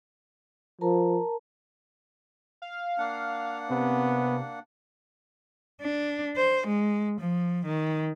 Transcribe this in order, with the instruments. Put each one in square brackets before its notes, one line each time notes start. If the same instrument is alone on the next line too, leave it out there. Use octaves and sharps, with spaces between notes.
[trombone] F3 [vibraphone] A#4 A5 A#5
[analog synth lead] F5
[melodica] A#3 D4 F#5
[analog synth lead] C3 [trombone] B3
[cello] D4
C5
G#3
F3
D#3